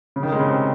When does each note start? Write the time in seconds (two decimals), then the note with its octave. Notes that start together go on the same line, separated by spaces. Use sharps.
0.16 C#3
0.23 D#3
0.32 G#3
0.39 C#3
0.48 C3